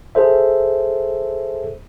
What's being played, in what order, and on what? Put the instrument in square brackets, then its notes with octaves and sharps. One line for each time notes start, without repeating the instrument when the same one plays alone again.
[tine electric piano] G#4 A4 C5 E5